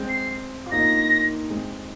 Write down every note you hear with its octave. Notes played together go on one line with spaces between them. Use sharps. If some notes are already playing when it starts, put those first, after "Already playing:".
Already playing: G#3 C4
C7
F4
A#3 D#4 A#6
G#3 C4